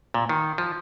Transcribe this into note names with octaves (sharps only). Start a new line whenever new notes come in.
A#2
D#3
F3